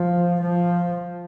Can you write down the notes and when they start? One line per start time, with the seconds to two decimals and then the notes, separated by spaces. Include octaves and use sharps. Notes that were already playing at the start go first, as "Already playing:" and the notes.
Already playing: F3
0.43 F3